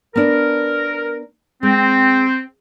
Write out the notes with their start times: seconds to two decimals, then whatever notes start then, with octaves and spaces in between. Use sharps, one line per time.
0.16 B3 D4 A#4
1.63 G#3 C4